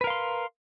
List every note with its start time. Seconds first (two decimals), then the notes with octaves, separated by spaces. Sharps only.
0.01 B4
0.04 A#4
0.07 F5
0.10 C6